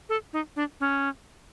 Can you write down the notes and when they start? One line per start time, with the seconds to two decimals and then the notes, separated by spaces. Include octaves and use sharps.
0.09 A4
0.33 D#4
0.56 D4
0.80 C#4